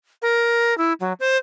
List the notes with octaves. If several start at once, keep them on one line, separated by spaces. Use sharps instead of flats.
A#4
E4
F#3
C5